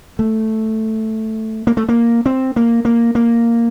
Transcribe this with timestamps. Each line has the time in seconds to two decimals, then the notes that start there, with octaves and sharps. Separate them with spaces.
0.19 A3
1.67 A#3
1.77 A3
1.89 A#3
2.26 C4
2.56 A#3
2.85 A#3
3.15 A#3